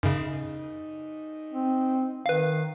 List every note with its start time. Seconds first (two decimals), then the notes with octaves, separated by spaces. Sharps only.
0.03 F#2 C#3 D#4
1.53 C4
2.26 D#3 B4 F5